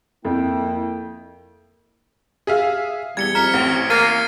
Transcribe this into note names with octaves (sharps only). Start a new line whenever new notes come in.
F2 A#3 E4 G5
G#4 E5 F5
E2 G3 G#6 C#7 G7
F2 A#5 F6 B6 C#7
A1 C4
A#3 F6 A6 C7 D#7